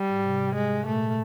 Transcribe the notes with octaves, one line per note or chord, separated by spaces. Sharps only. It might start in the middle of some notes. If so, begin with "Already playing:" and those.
Already playing: G3
G#2
C3
G#3
A#2 A3